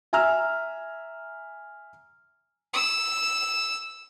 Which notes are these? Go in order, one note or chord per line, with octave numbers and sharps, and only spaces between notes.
E5 G#5 A#5 E6 F6
E6